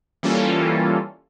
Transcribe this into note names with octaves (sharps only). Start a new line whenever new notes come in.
E3 G3 A#3 C#4 F4 A4